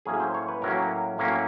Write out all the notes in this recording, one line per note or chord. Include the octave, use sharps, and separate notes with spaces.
A2 F#3 A#3 C#4 G#4
C5
C#5
B4
A2 F#3 A#3 C#4 A#4
A2 F#3 A#3 C#4